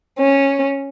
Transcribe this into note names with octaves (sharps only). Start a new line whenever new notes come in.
C#4